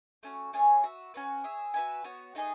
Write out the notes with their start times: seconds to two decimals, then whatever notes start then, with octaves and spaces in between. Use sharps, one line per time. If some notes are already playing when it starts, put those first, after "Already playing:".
0.23 A3 C#4 F#4
0.53 A3 C#4 G#4 C#5
0.84 F#4 B4 E5
1.14 C#4 F#4 B4
1.44 G#4 C#5 E5
1.74 F#4 B4 E5 G#5
2.04 B3 F#4 C#5
2.35 A3 D#4 G#4 D#5